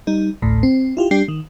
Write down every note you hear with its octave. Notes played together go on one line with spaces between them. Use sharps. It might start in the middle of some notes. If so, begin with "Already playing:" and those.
G3 D#4
A1 D2 A2
C4
E4 F4 G4
G3 D4 G4 C7
D#3